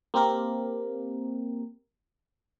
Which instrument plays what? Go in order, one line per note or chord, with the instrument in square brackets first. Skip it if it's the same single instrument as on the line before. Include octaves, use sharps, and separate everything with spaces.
[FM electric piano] A#3 C4 G4 A#4